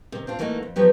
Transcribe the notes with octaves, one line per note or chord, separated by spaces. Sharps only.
C3 D#3
C4 D4 F4
E3 A3 A#3 D#4 E4 F#4
F2
F3 F#3 B3 G4